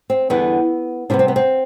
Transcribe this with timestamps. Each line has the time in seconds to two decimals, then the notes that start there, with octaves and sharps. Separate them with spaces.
0.10 C4
0.30 E2 D3 G3 B3
1.10 C3 G3 B3 D4
1.19 C4
1.28 B3
1.36 C4